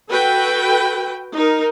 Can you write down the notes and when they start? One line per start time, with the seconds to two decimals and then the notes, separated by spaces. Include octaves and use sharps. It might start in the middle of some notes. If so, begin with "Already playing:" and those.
0.10 F#4 A4 B4 G5
1.34 D#4 A#4